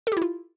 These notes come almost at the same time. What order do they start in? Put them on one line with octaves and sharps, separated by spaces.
A4 G4 E4 F4